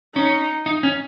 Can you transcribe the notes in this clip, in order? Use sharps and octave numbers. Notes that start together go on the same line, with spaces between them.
C#4 D#4
D#4
C#4